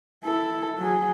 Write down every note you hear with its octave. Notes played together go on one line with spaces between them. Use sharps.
E4 A4
F#3 G#4